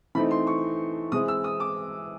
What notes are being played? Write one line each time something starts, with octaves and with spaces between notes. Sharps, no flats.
E3 A3 C4 D#4 B5
C6
C#6
E3 G#3 C4 E4 D#6
E6
D#6
D6